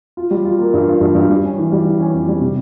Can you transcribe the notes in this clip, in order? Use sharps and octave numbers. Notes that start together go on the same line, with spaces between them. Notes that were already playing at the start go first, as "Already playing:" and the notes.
F4
G3
F4
A#3
G2
F4
G2
G2
G3
C#4
E3
G3
E3
C#4
F2
G3
C3